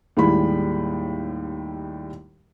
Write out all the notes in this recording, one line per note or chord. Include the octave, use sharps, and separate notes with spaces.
D#2 A2 G3 G#3 B5